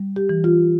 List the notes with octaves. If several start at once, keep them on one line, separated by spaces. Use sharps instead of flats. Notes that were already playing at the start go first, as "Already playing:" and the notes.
Already playing: G3
G4
E3
F4